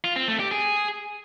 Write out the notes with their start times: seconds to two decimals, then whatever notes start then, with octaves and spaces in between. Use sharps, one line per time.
0.04 F4
0.16 C4
0.28 A3
0.40 G4
0.51 G#4